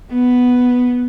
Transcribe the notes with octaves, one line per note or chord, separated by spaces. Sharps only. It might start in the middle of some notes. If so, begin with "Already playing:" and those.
B3